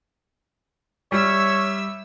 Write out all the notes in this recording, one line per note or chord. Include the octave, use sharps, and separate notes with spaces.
G3 C#5 E5 E6